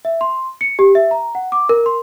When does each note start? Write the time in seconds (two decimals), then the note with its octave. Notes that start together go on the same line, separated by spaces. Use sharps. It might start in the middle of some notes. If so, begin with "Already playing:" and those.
0.05 E5
0.21 C6
0.61 C#7
0.79 G4
0.95 E5
1.11 A#5
1.35 F#5
1.52 D6
1.69 A#4
1.86 C6